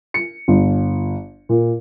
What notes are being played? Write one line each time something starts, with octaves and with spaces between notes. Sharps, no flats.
C#7
G1
A#2